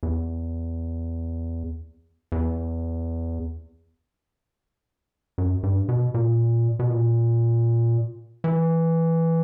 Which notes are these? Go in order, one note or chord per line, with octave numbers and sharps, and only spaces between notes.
E2
E2
F#2
G2
B2
A#2
B2
A#2
E3